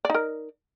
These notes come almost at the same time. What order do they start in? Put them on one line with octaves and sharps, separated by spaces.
D5 D#4 A#4